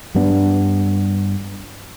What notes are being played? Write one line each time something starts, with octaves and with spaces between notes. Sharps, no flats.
G2 G3 B3 D4